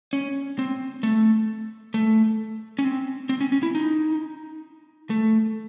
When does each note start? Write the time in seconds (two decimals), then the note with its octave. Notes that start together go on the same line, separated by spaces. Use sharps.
0.13 C#4
0.59 C4
1.03 A3
1.94 A3
2.79 C#4
2.84 C4
3.29 C4
3.41 C#4
3.52 C#4
3.63 E4
3.75 D#4
5.10 A3